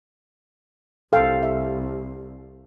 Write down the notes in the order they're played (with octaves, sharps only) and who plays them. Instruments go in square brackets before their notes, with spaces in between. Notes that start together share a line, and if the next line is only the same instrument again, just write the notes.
[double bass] C2 [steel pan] A4 F5 G5
[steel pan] E5